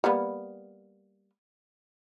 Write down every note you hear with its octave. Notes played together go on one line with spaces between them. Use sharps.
G3 A#3 B3